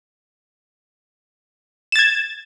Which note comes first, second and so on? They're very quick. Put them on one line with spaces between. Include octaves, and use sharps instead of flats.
E7 A6 G#6